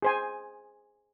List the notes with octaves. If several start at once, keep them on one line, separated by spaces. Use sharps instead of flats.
G#4 C5 G#5